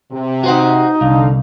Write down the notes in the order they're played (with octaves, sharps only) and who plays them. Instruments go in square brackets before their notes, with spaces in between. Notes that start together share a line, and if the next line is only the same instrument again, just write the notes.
[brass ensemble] C3
[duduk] D#4 [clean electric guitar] F#4 C5 F#5
[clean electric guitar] C2 [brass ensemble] D3 F5